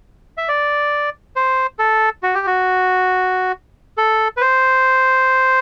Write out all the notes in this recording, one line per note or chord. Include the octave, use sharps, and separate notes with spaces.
E5
D5
C5
A4
F#4
G4
F#4
A4
B4
C5